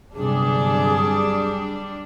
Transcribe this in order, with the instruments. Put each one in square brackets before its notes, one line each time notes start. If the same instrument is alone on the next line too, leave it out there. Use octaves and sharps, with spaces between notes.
[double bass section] G1 C3 F#3 [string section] G3 D4 [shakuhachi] G#4